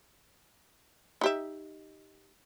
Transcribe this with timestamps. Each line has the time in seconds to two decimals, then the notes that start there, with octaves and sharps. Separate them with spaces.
1.21 D#4 G4 E5